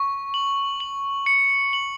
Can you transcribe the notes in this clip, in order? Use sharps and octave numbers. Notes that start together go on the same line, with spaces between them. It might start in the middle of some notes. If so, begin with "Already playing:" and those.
Already playing: C#6
F#7
F#7
C#7
F#7